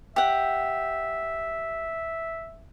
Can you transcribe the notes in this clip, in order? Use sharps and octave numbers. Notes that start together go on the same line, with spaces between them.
G4 E5 F#5